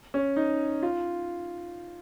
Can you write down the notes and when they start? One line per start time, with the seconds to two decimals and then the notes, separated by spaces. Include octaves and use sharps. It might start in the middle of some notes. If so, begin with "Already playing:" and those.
0.14 C#4
0.36 D#4
0.83 F4